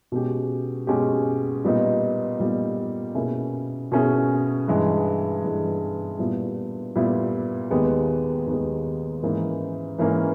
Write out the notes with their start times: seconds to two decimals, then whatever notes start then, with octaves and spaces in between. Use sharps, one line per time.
0.12 B2 G#3 C#4 G4
0.87 B2 G#3 C#4 G4
1.64 A#2 G3 B3 D#4
2.39 A#2 G3 B3 D#4
3.15 B2 A#3 C#4 E4 G#4
3.92 B2 A#3 C#4 E4 G#4
4.68 G2 E3 G#3
5.44 G2 E3 G#3
6.19 A#2 G3 B3 E4
6.95 A#2 G3 B3 E4
7.70 D#2 D#3 G#3 B3 G4
8.46 D#2 D#3 G#3 B3 G4
9.23 G#2 E3 A#3 C#4
9.98 G#2 E3 A#3 C#4